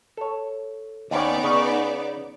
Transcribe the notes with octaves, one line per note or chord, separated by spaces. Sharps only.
A4 C#5
D#2 B3 C#4 D#4 D5
C#3 C#4 C#5